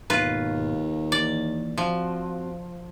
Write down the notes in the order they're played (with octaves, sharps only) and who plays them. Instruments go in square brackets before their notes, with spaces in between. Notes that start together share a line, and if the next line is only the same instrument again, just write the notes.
[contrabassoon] D#2 [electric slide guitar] G#2 B2 [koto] F4 B4
[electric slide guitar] E3 A#3 [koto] D5
[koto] F3 [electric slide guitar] C4 F#4